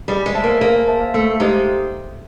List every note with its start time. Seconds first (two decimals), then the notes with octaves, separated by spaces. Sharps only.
0.08 G3 G#4
0.26 G#3
0.35 C5 E5 A5
0.44 A#3
0.61 A#3 G#4
0.88 C5 E5 A5
1.14 A3 A#3
1.40 G#3 D#4 G4 C5